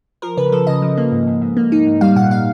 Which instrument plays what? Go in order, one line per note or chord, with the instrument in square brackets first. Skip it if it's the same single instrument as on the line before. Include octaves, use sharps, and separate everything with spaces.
[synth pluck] F3 A#4
C#3 B4
F3 A4
C#3 D#5
F3
A#3
G#2
G#2
G#2
A#3
D#4
G#2
G3 F5
A#2 F#5
A#2 F5